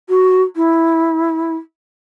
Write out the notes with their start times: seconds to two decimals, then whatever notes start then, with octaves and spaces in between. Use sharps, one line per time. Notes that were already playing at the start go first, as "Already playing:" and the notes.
0.09 F#4
0.56 E4